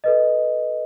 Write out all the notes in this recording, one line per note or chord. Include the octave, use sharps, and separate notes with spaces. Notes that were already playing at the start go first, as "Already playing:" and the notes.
A4 B4 D#5